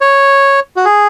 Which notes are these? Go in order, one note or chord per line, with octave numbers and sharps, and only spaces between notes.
C#5
F#4
G#4